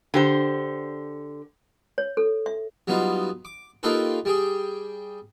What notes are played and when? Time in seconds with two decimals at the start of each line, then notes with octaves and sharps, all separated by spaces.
0.14 D3 G4 C5
1.98 C#5
2.17 A4
2.46 E5
2.87 F#3 G3 B3 D#4 F4
3.45 D6
3.83 A#3 D#4 F4 G4 A4 B4
4.25 G3 G4 G#4